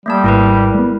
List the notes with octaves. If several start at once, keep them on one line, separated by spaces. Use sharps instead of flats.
G3 A3 A#3 A5
G#1 E4 A#4 B4
G#3 B3